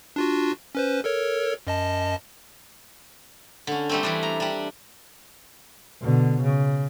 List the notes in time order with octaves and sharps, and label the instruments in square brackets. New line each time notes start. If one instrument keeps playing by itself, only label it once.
[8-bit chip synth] D4 F4 F#4
C#4 B4 C5
A4 A#4 C#5
F#2 D#5 A5
[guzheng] D3 C#4
G3 A3 C4
E3 G3 D4
A#5
G3 D4
[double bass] B2 D3
C#3